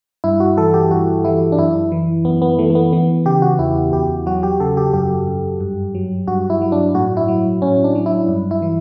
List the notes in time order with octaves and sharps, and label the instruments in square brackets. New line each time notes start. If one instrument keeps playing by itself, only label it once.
[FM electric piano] G2 E4
F#4
E3 A4
G4
G2 F#4
E3 E4
D4
F#2 E4
E3
F#2 B3
B3
E3 A3
A3
B3
E3 B3
C#3 G4
F#4
E2 E4
E2 G4
F#3 F#4
G4
C#3 A4
G4
F#2 G4
F#2
G2
F#3
G2 F#4
E4
F#3
D4
A2 F#4
E4
F#3
A2 C#4
D4
F#3
E4
G2
E4
E3